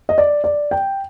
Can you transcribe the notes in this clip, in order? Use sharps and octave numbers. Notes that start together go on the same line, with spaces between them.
D#5
D5
D5
G5